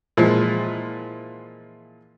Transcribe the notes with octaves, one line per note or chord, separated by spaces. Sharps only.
A#2 E3 F3 G#3